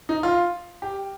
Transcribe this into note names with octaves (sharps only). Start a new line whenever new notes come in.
D#4
F4
G4